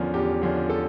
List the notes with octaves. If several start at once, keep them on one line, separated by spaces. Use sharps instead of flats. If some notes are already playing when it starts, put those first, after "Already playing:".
Already playing: E2 D3 F3 C#4 A#4
E2 G4
D3 F3 C#4
A4